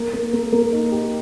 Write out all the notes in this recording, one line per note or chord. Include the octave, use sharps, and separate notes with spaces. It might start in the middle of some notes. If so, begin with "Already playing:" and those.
Already playing: A#3
A#3
A#3
A#3
D#4
G4